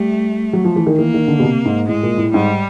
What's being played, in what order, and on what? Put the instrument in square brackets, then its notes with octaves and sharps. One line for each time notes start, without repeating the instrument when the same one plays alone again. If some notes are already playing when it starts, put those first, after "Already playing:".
Already playing: [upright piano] G3 [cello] A3
[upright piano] F#3
F3
E3
D#3
[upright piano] E3 [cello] A#3
[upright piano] D#3
D3
B2
C3
G#2
[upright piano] A2 [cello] G#3
[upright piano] A#2
A2
[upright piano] G#2 [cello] G3